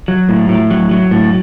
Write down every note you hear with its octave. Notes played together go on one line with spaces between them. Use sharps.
F#3
A2
A2
F#3
F#3
A2